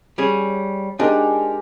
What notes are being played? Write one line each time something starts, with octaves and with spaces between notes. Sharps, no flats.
G3 C#4 G#4
G#3 D4 D#4 G4 A#4